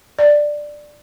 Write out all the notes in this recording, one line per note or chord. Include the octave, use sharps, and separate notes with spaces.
D5